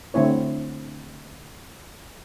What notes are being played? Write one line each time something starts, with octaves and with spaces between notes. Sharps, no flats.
D3 A3 C4 E4 C#5